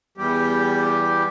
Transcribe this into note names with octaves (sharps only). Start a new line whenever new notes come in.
E2 G3 G4